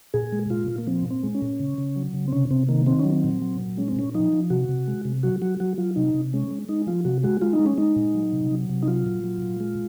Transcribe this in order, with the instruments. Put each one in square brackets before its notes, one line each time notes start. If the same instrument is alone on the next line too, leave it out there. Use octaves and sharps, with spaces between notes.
[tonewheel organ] A#2 G#4
G#3
A#2 F4
A#2
A#3
F3 C4
A#2 C4
G#3
C#4
A#2
C#3
C#3
F#3
C#3
C4
C3 C#4
C3 C4
D#3 A#3
D#3 C4
C#4
F#3
C4
A#2
F#3
A#2
G#3 C#4
C4
A#2 C#4
F3 D#4
F3
C3 F#4
C3
G#3
C3
F#3 F#4
F#3 F#4
F#3 F#4
F#3 F4
C3 D#4
C3
G#3 C#4
G#3
G#3 D#4
F3 F4
C3 F#4
G#3 F#4
G#3 F4
D#4
G#3
C#4
G#3 D#4
A#2
F#3
C3
F#3
C3
D#4
F#3 F4
A#2
F#3
A#2
G#3